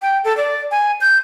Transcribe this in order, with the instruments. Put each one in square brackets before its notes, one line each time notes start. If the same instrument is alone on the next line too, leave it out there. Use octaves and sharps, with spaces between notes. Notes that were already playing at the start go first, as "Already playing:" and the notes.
[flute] G5
A4
D5
G#5
G6